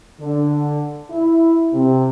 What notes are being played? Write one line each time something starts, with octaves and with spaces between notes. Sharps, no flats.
D3
E4
C3